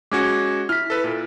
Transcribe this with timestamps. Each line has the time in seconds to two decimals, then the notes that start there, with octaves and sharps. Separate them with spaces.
0.12 G#3 C#4 F#4 D6 G#6 C#7
0.69 E4 F6 B6
0.90 A4 B4
1.04 A#2